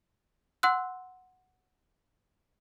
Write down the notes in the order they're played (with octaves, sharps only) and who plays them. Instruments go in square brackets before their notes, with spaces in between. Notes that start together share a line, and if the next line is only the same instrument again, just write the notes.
[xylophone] F#5 C6 E6 F#6